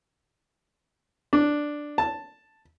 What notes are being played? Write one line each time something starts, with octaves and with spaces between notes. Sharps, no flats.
D4
A5